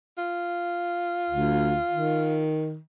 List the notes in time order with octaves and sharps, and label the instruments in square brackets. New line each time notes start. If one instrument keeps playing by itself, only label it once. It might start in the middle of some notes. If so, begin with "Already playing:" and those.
[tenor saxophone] F4
[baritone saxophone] D2
D#3